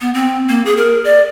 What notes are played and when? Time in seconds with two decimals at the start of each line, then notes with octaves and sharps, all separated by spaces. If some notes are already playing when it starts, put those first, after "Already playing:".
0.01 B3
0.14 C4
0.49 A#3
0.65 G#4
0.77 A#4
1.04 D5